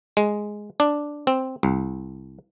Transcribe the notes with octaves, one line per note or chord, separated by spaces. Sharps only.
G#3
D4
C4
C2